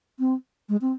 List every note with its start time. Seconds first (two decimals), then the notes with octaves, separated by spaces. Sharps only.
0.19 C4
0.69 G#3
0.81 C4